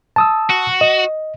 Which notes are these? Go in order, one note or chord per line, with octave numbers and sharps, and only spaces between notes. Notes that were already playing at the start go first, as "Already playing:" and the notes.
A5 D#6 E6
F#4
D#5